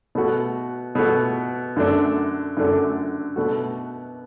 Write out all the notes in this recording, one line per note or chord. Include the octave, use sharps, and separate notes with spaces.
B2 A3 F#4
B2 A3 F#4
F#2 D3 A3 D4
F#2 D3 A3 D4
B2 A3 F#4